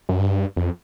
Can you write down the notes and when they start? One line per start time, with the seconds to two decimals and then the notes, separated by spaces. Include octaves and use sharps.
0.09 F#2
0.19 G2
0.56 F2